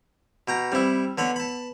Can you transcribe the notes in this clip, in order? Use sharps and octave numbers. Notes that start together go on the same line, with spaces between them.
B2 G5 A#5
G3 C4 E4 G4
D3 B3 B4 C#5 B5
A5 B5